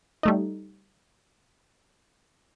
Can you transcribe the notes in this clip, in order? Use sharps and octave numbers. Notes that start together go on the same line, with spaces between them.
G3 A3 D#4